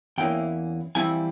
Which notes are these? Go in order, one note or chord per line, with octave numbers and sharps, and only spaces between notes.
E2 E3 A#3 C#4 E4 G5
F2 E3 G3 C4 E4 G#5